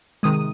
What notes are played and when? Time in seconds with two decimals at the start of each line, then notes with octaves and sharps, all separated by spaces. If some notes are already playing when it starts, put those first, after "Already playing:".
0.23 C3 D#3 G#3 D#6